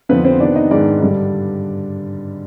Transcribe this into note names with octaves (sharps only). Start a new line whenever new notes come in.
F2 D3 F3 B3 C4 B4
C4 C5
C3 D#3 B3 D4 D5
D#4 D#5
G#2 D#3 G#3 B3 D4 D5
G2 D3 G3